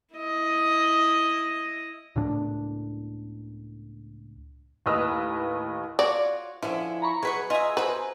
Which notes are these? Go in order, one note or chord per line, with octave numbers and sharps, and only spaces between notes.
E4 D#5
C#2 A2 D4
D#2 A2 B4 D#5 E6 F6
F4 F#4 C#5 D5
D3 F3 C#4 E4
A#5 B5 C#6
B2 F#3 G#4 B4 C#6
F4 G#4 D#5 E5 G#5 A#5
B2 F#4 B4 C5